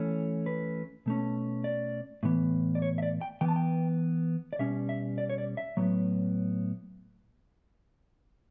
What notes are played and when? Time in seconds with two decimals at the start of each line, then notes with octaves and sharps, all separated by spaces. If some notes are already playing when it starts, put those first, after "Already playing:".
Already playing: E3 A3 C#4
0.46 B4
1.06 B2 A3 C#4
1.64 D5
2.23 A2 E3 B3
2.75 D5
2.82 C#5
2.98 E5
3.02 D5
3.21 G5
3.41 E3 B3 G5
3.48 A5
3.56 G5
4.53 D5
4.59 B2 G3 C#4 E5
4.89 E5
5.18 D5
5.30 C#5
5.38 D5
5.57 E5
5.77 A2 F#3 B3